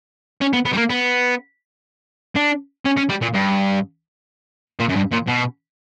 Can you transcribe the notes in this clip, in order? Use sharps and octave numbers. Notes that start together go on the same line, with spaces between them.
C#4
B3
B3
G3
A#3
B3
D4
C#4
C#4
G3
A#2
G2
A#2
F#2
G2
A#2
B2